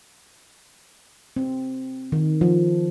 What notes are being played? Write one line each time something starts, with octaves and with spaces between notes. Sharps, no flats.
C4
D#3
F3